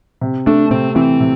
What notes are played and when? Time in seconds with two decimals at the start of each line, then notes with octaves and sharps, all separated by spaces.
0.21 C3
0.46 A3 D4
0.71 C3 C4
0.96 E3 C4
1.20 C3